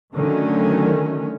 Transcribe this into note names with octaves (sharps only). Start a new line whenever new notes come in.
D3 D#3 F#3 A3 C#4